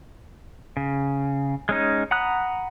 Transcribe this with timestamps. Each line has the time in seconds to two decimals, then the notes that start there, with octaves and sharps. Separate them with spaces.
0.77 C#3
1.69 G#3 C#4 D#4
2.11 F#5 A#5 B5 D#6 F#6